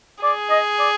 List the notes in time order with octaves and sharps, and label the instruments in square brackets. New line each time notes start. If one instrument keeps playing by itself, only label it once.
[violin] G#4 [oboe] D5
[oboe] D#5
D5